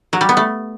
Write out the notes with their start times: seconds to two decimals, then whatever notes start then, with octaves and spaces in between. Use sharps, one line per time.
0.13 F#3
0.21 G3
0.29 B3
0.37 A3